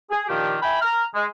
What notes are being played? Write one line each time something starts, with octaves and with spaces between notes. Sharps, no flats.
G#4
A#2 D#3 F3 D4 G4
E5 G5 G#5 B5
A#5 F6
G#3